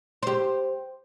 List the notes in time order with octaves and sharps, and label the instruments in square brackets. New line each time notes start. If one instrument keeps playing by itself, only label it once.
[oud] G4 C5